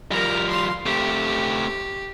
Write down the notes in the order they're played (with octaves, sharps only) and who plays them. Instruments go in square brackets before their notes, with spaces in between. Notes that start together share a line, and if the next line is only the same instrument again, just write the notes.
[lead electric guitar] F3 G3 [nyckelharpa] A#4 A#5
[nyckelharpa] F5 C6
[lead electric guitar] A3 C4 [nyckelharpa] G4